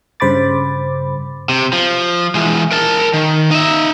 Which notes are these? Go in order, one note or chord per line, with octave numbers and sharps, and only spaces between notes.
G2 C#3 C5 B5 D6 A6
C3
F3
E3 G#3
A#4 A5
D#3
D#4 E5